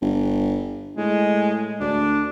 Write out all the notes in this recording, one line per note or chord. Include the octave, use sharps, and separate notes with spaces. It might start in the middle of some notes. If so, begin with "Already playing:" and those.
G1
A2 G#3
D2 D4